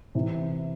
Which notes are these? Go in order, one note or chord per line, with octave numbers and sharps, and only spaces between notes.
C3 E3